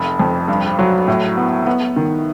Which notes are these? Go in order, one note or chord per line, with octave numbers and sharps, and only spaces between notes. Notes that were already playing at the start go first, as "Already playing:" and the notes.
Already playing: F1
F2
G2
F#3
A2
B3
B3
D#3